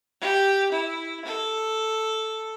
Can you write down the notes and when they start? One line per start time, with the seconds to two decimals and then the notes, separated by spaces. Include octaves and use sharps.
0.21 G4
0.72 E4
1.25 A4